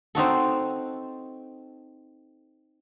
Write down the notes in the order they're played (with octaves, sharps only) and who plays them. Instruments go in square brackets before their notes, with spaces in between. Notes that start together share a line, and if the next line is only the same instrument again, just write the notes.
[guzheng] C4 D#4 F#4 A4